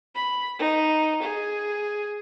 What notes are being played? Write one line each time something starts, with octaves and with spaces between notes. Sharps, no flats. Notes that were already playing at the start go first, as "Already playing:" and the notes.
B5
D#4
G#4